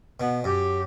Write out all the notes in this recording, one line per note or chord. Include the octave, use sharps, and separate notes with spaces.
B2 B3
F#2 G4